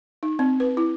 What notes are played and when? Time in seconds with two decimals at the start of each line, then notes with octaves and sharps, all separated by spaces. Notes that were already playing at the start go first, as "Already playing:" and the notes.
0.23 D#4
0.39 C4
0.60 B4
0.77 E4